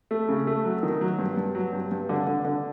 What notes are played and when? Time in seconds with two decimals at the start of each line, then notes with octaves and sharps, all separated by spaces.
0.11 A3
0.28 C#3
0.47 A3
0.65 F#3
0.83 D#3
1.01 F#3
1.18 G2
1.37 G2
1.55 F#3
1.73 G2
1.91 G2
2.09 D3
2.26 D3
2.44 D3